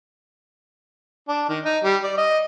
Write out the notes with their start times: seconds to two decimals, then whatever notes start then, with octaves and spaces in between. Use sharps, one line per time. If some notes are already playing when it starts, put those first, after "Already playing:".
1.29 D4
1.49 D#3
1.65 D#4
1.84 G3
2.03 D5
2.18 D#5